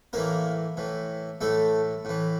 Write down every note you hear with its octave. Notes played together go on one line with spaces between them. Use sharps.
A2 E3 A#3 A#4
A2 E3
A2 E3 A3 A4
A2 E3